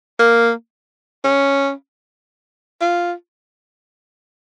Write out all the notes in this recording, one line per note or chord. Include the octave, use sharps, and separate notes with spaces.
A#3
C#4
F4